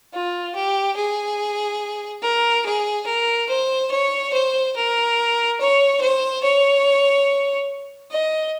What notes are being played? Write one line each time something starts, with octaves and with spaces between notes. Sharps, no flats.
F4
G4
G#4
A#4
G#4
A#4
C5
C#5
C5
A#4
C#5
C5
C#5
D#5